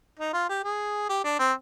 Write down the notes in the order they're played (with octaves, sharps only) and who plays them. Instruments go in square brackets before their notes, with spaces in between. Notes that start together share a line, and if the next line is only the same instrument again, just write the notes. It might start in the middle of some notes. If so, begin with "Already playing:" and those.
[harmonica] D#4
F4
G4
G#4
G4
D4
C4